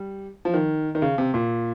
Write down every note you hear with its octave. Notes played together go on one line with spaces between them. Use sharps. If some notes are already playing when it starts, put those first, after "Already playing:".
Already playing: G3
F3
D#3
D#3
C#3
C3
A#2